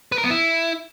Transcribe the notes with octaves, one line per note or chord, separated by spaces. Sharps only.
B4
A#4
B3
E4